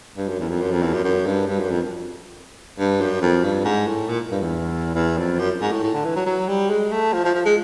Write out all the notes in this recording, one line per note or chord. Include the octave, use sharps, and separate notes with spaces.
G2
F#2
E2
F2
F#2
F2
E2
F#2
F#2
G2
G2
F#2
F2
G2
F#2
F2
G2
G#2
A2
A#2
G2
E2
E2
F2
F#2
G#2
A2
A2
D3
E3
F#3
F#3
G3
G#3
A3
F3
F3
F3
G#3